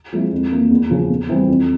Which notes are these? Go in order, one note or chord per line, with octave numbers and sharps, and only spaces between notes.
F3 G#3 C4 E4
F2
E3 A#3
E2
C#3 F3
E2
E3 G3 C4
F2